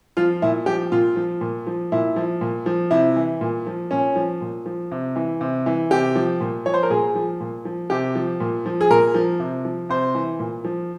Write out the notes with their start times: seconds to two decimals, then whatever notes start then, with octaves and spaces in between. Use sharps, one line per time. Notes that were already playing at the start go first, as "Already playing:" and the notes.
0.17 F3 F4
0.42 A#2 E4
0.66 F3 G4
0.92 A#2 F4
1.16 F3
1.41 A#2
1.67 F3
1.92 A#2 E4
2.16 F3
2.41 A#2
2.66 F3
2.91 C3 E4
3.16 E3
3.41 A#2
3.67 F3
3.91 A#2 C#4
4.16 F3
4.41 A#2
4.66 F3
4.91 C3
5.16 E3
5.41 C3
5.66 E3
5.91 C3 G4
6.15 F3
6.40 A#2
6.66 F3 C#5
6.74 C5
6.83 A#4
6.90 A#2 G#4
7.15 F3
7.40 A#2
7.65 F3
7.90 C3 G4
8.15 F3
8.40 A#2
8.66 F3
8.81 G#4
8.90 A#2 A#4
9.14 F3
9.39 C3
9.65 F3
9.89 C3 C5
10.15 E3
10.39 A#2
10.65 F3